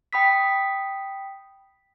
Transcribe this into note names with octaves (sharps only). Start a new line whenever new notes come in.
G5 B5 D#6 B6